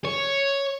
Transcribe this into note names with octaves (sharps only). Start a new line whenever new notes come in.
C#5